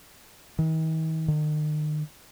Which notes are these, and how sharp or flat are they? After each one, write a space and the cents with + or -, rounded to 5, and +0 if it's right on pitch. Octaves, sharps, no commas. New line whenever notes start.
D#3 +45
D#3 -45